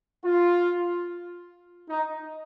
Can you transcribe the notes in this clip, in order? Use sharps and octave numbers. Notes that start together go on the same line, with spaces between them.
F4
D#4